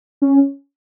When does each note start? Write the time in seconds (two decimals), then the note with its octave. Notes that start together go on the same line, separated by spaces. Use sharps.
0.22 C#4